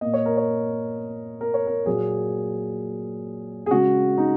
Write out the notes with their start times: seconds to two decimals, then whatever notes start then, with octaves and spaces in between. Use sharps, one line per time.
0.01 A#2 A#3 D#5
0.14 C#5
0.26 A#4
0.37 C#5
1.41 A#4
1.54 C#5
1.67 A#4
1.86 A#2 F#3 A#3 G#4
3.66 G#4
3.71 C#3 G#3 F#4
4.18 D#4